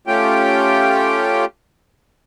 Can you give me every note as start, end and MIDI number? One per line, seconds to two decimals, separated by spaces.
0.07 1.45 57
0.07 1.45 61
0.07 1.45 65
0.07 1.45 67
0.07 1.45 79